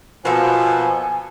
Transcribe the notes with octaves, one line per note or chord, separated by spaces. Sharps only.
B2 F3 A#3 A4 G#5